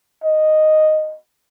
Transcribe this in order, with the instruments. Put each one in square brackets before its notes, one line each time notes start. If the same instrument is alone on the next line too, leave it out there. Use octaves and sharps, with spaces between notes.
[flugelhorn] D#5